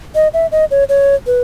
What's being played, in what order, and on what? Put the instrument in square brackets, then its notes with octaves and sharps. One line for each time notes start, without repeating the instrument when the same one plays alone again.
[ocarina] D#5
E5
D#5
C#5
C#5
B4